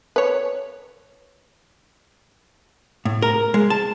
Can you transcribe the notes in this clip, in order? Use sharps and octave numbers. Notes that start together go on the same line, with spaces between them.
B4 C#5
A2
A#4
G#3
A5